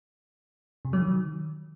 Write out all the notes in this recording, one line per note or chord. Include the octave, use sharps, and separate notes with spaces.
C3
F#3
D#3